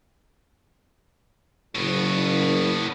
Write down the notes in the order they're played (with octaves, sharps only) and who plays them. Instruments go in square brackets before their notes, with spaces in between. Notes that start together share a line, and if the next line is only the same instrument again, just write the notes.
[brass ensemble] F#1 [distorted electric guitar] A2 B3